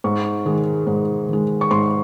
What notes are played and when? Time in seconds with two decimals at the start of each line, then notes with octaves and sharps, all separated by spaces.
0.04 G#2 C#6
0.45 D#3 G#3
0.87 G#2
1.29 D#3 G#3
1.61 C#6
1.71 G#2 C6